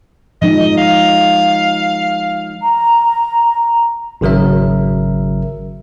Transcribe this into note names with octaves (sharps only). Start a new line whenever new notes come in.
F3 G#3 D#4 D#5
F5
A#5
G#1 C#3 F#3 A#4 E5